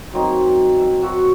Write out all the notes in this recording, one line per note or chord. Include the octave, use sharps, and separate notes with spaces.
F#3 A#3 C4 D#4
E6
F#4 E6